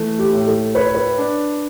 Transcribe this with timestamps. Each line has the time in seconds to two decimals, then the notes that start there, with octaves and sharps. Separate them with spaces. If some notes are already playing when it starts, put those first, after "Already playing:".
Already playing: E3 A3
0.19 G4
0.33 A2
0.47 A4
0.75 B4 C#5
0.95 B4
1.18 D4